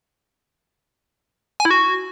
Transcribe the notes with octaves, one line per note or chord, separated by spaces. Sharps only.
G#5
E4
F#4